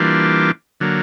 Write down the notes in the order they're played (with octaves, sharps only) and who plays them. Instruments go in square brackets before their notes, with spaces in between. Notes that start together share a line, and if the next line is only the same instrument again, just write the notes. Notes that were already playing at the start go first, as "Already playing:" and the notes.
Already playing: [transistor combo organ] E3 G3 A#3 D4 F4
D3 F#3 A#3